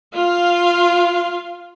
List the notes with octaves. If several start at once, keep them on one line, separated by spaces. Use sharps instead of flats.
F4 F5